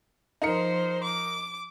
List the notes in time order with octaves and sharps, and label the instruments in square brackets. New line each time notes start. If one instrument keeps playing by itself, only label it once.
[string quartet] F3 C5 [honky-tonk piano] D#4 A#4 C#7
[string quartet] D6